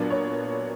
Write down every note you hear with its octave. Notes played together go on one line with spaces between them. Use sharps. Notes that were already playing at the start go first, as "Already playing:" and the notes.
Already playing: A#2 F#3 B3 D4
C#5